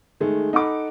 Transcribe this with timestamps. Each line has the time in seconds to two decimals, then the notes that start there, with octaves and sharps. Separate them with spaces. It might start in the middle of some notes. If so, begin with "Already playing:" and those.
0.20 D#3 G#3 A3
0.53 D#4 A4 F#5 B5 D6